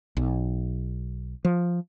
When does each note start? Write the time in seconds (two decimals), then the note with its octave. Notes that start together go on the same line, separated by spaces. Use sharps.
0.17 B1
1.45 F3